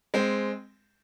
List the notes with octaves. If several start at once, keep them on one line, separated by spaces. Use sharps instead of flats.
G#3 C4